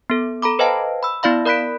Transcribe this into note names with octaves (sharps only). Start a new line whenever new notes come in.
B3 A4
A4 A#5 B5 D6
B4 C5 D#5 F5 G5 A5
B5 E6
B3 E4 D5 F5 B5
A#4 D5 B5 F#6 B6 D7